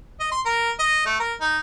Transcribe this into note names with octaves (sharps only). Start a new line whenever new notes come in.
D#5
C6
A#4
D#5
A3
A#4
D#4